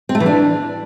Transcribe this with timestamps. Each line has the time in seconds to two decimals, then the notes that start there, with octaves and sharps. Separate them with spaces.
0.09 C4
0.15 A3
0.20 E3
0.26 D4